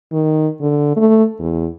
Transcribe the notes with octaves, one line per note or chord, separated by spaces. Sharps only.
D#3
D3
A3
E2